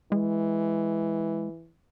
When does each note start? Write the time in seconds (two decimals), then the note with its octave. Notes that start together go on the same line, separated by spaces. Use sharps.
0.12 E3 G#3